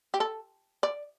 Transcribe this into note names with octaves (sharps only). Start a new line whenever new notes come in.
G4
A4
D5